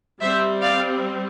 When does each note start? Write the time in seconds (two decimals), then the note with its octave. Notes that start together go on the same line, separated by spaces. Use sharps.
0.21 G3 C4 C5 E5
0.61 D5 F5